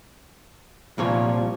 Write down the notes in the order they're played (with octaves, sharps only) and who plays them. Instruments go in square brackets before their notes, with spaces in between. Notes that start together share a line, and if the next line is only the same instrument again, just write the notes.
[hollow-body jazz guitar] C2 A#2 C#5 [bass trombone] F3